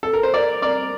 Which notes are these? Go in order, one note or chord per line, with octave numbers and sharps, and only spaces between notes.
A4
A#4
C5
A#4 D5
A#4 D5